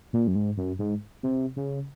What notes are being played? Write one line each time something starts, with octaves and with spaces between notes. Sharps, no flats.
A#2
F#2
G#2
F#2
G#2
C3
C#3